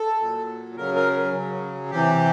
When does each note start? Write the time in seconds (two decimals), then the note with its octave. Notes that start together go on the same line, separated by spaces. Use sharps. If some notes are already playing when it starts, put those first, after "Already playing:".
Already playing: A4
0.20 A#2 F#3
0.77 C#3 F#3 A#4
0.95 A#4
1.34 C#3 F#3
1.91 C3 E3 G4